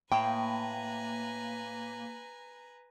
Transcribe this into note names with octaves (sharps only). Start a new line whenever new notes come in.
A2 A#3 B4 G5 G#5 A#5